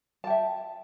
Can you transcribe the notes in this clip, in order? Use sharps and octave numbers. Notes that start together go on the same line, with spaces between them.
E5 G5 A5